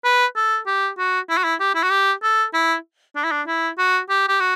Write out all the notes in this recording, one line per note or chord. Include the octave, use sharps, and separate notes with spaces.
B4
A4
G4
F#4
E4
F#4
E4
G4
E4
F#4
G4
A4
E4
D4
E4
D4
E4
F#4
G4
G4
F#4